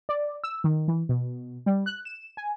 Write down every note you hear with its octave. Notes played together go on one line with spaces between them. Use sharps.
D5
E6
D#3
E3
B2
G3
F#6
E7
G#5